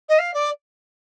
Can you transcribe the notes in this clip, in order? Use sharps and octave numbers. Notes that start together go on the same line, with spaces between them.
D#5
F5
D5